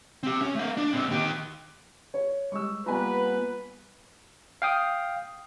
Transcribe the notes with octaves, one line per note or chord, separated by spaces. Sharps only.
C4 G4
C#4
A3 F5
D4
A#2 C4
D#3 G4
C#5
G3 G#3 C#6 E6
G3 A#3 B3 F4 B4 D5 G#5 A#5
F5 G5 D#6